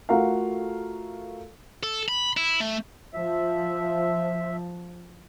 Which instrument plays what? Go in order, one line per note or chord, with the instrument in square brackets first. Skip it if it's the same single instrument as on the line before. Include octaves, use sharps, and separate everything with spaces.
[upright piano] A3 F4 F#4 A4 A#4 F5
[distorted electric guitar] A4
B5
E4
A3
[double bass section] F3 [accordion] E5